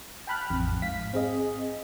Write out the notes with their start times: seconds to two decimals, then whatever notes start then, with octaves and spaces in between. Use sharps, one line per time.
0.27 G5 A5 B5 F6 F#6
0.50 A1 F2
0.82 G#2 F5 B6
1.14 C4 G#4 D#5